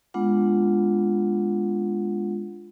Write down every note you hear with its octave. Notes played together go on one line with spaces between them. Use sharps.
G#3 B3 D4 F4 F#5